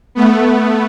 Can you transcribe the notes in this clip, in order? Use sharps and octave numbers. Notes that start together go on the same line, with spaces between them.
A3 B3